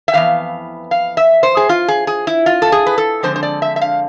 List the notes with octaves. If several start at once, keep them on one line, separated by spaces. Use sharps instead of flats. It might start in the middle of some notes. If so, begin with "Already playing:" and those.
E5
F2 E3 B3 F5
F5
E5
C5
G#4
F4
G#4
G#4
E4
F4
A4
G#4
B4
A4
D3 F3 G#3 C4 C5
C5
D5
E5
E5
F5